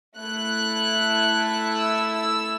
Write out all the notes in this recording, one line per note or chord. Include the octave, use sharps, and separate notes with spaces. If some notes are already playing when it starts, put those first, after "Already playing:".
A3 E4 A4 F#6
F#6
E6
E6